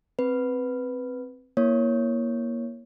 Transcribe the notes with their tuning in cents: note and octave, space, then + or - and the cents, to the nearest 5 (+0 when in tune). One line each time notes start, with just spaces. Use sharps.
C4 +0 B4 +0
A#3 +20 E4 +0 C#5 +0